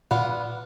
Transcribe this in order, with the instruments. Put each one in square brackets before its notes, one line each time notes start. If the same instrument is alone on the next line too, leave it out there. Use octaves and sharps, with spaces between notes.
[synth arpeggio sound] A#2 [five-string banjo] B3 D4 F4